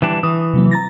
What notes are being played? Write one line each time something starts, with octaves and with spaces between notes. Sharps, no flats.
E3 G3 D4
E3 D#6
C3 F#3 A#3
A#5 A6 A#6